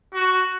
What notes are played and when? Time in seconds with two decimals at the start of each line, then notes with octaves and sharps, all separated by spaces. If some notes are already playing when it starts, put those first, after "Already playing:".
0.14 F#4